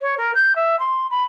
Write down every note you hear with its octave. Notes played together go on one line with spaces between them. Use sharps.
C#5
A#4
G6
E5
C6
B5